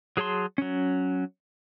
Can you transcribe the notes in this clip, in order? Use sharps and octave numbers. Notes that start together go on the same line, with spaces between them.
F#3 G#4 C#5 A5 C6
F#3 C#4